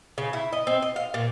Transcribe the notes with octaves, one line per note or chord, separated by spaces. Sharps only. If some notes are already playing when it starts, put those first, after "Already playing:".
C#3
E4
D#5
C4
D#5
F5
A#2